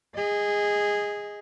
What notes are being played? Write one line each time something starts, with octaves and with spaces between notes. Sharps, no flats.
G#4 D#5